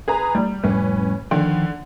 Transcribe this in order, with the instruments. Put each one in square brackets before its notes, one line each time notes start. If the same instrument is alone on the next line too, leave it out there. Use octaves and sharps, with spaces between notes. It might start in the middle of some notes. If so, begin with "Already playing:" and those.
[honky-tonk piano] G#4 B4 A#5
G3
[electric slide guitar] F2 A2 G3 [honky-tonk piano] C#4 B4
[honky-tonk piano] D3 [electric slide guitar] D#3 F3 G5